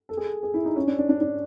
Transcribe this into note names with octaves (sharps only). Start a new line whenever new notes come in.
A4
G#4
G#4
E4
D#4
C#4
D4
D4
D4
D4